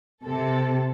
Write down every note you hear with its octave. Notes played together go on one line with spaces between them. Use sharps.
C3 A4